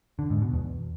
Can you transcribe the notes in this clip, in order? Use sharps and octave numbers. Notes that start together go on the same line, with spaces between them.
D3
G#2
B2
E2